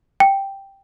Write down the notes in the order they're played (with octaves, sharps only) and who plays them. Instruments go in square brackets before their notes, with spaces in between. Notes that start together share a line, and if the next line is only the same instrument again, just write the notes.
[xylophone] G5